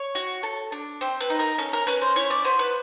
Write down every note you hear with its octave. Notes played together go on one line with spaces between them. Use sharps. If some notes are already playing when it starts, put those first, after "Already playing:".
Already playing: C#5
F#4
A4
D4
C4 C5
B4
D#4
A#4
C#4 A4
A#4
C#4 B4
C5
E4 C#5
D5
B3 C5
B4